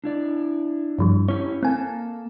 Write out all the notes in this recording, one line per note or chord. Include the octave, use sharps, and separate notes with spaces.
D4 E4 D5
G2 F3 G3
C#4 E4 G4 C#5
A#3 C4 A4 G#5